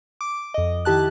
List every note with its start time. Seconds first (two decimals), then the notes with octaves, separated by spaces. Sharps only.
0.21 D6
0.54 F2 D#5
0.85 D#3 E4 G4 A5 F#6